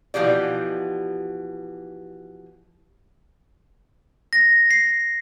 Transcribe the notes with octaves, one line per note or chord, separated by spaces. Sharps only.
B2 E3 F3 G4 D5
A#6
C7